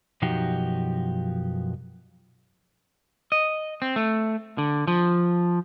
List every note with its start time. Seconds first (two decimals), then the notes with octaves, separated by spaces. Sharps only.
0.22 F#2 B2 F3 D#4 F#4 G4
3.32 D#5
3.82 C4
3.96 A3
4.58 D3
4.88 F3